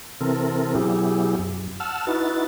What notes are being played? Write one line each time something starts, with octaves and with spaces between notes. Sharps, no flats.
C3 E3 C4 A4 A#4
B2 F#3 E4 G4 G#4
F#2
F#5 A5 E6 F6
D#4 E4 F#4 B4 A6